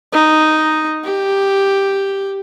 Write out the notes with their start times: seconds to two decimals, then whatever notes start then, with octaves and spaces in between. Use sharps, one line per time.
0.12 D#4
1.04 G4